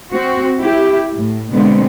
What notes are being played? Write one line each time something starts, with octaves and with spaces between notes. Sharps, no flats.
C4 F#4
E4 G4
A2
B2 D3 G#3 B3 C4